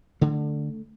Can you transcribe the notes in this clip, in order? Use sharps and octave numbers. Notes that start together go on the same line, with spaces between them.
D3 A3